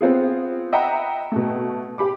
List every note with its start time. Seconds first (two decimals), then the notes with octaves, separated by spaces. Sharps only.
0.01 B3 C4 F4 G#4
0.73 D#5 E5 F#5 G5 A#5 B5
1.32 B2 A3
1.98 G4 B5 D6